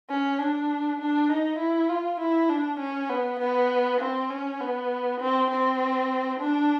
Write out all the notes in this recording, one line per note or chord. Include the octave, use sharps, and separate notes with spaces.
C#4
D4
D4
D#4
E4
F4
E4
D4
C#4
B3
B3
C4
C#4
B3
C4
C4
D4